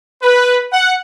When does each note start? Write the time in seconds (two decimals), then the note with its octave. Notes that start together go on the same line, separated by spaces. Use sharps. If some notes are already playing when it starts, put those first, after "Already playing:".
0.22 B4
0.72 F#5